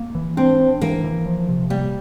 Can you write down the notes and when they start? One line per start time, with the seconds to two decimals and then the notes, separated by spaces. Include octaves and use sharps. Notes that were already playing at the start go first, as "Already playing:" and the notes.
Already playing: A#3
0.15 E3
0.37 C4 D4
0.60 D4
0.81 E3 A#3
1.04 E3
1.26 F3
1.49 C3
1.70 G3 A#3